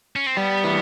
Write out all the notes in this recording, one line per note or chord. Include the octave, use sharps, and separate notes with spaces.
C#4
C4
G3 B3
E3